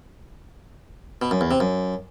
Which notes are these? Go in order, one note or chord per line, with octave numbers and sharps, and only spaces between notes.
B2
F#2
E2
C3
F#2